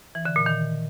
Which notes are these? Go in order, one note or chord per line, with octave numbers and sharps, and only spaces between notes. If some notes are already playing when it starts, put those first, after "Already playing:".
E3
D3
A#2
D#3